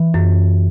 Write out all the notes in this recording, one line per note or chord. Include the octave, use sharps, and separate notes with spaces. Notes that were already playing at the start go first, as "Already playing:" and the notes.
Already playing: E3
F#2